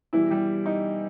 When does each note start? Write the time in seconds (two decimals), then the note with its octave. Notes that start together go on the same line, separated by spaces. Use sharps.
0.13 B2 E3 G3 E4
0.30 G3 G4
0.66 D#4